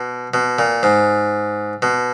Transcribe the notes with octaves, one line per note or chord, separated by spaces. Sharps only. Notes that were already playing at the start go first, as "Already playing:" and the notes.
Already playing: B2
B2
A#2
G#2
B2